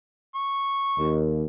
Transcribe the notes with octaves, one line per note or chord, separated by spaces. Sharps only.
C#6
D#2